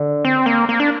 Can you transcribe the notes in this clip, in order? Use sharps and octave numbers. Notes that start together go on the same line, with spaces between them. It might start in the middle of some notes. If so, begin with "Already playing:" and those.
Already playing: D3
C4
A#3
A#3
D4